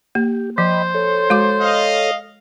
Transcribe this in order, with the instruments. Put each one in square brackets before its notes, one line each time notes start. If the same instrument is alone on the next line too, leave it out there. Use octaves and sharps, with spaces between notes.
[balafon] A#3 [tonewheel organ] G4
[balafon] F3 [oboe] C5 [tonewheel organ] D#5 G5 B5
[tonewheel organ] A4 C#5
[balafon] G#3 F#4 D6
[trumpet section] D#5 F5